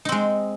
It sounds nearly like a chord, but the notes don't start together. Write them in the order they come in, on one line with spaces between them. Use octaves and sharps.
D#4 C4 G#3